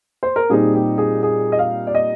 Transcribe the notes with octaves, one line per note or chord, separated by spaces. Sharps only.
C5
A#4
A#2 G3 C4 D#4 G#4
G4
G#4
G#4
D#5
F5
D5
D#5